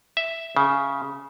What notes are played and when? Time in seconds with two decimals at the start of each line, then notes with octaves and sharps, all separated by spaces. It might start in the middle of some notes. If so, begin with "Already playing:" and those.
0.17 E5
0.56 C#3